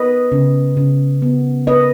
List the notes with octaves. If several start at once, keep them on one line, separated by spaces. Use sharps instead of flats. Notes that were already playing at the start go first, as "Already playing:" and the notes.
Already playing: B3 B4 D#5
C#3
C#3
B3
B3 B4 D#5